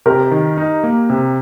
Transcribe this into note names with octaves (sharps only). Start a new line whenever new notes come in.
C3 G4 A#4
D#3
D#4
A#3
C3